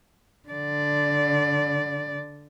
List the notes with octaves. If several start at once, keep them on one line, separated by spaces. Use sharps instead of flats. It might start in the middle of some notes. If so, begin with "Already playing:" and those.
D3 D5